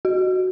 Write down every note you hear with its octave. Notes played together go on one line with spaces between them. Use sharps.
F#4